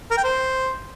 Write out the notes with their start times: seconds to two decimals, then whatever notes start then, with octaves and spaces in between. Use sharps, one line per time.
0.11 A#4
0.17 G5
0.24 C5